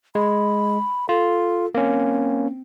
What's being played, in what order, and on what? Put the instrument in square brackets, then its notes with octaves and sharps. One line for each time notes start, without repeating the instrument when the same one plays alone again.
[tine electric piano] G#3 [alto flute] B5
[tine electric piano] F4 [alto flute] A4
[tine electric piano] A#3 C#4 [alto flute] C4